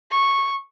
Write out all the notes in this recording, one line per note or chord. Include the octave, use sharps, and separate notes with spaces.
C#6